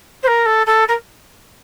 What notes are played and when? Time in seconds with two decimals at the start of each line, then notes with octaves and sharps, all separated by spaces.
0.23 C5
0.27 A#4
0.45 A4
0.66 A4
0.88 A#4